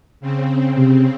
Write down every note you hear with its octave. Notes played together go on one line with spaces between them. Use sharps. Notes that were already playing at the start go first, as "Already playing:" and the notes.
C#3 C4
C3